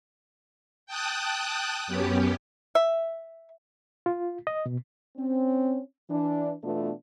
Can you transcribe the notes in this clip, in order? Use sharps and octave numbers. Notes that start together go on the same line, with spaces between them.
G5 A5 D#6 F#6
F#2 B3 C#4 G4
E5
F4
D#5
B2
C4 C#4
E3 D4
B2 E3 A3 B3 D4 F4